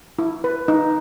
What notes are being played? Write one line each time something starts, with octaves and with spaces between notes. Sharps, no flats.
E4
B4
D#4